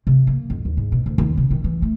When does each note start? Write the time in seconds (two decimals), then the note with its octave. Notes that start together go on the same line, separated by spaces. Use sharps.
0.07 C3
0.27 A#3
0.50 F2
0.65 D#2
0.77 G#2
0.92 B2
1.06 D2
1.18 D#2
1.37 C3
1.51 D#3
1.64 E3
1.82 A3